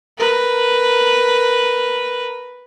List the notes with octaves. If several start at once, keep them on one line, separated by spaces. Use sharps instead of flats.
A#4 B4